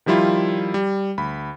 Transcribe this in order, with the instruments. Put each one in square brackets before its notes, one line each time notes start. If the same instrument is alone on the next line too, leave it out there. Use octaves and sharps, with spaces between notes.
[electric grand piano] D#3 F3 G3 E4 F4
G3
D2 B5